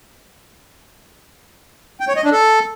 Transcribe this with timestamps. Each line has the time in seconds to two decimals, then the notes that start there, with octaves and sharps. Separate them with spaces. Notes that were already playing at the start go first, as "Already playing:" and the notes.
2.00 G5
2.08 C#5
2.16 D#5
2.24 D4
2.32 A4